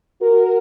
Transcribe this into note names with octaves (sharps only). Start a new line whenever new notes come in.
F#4 A#4